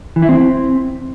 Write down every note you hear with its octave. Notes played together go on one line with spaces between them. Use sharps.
E3
E4
C4